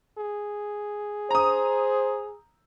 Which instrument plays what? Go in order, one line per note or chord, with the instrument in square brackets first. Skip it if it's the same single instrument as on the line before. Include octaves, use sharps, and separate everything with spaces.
[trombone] G#4
[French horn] C5 [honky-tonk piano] A#5 D#6